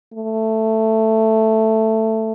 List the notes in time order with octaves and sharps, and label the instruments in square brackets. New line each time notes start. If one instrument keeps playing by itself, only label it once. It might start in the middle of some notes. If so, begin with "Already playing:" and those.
[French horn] A3